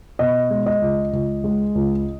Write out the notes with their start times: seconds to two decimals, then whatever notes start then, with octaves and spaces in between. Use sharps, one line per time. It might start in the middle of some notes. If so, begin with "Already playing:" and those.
0.19 B2 D#5
0.50 G#3
0.66 D#5
0.82 C#2
1.13 C#2
1.44 G#3
1.75 C#2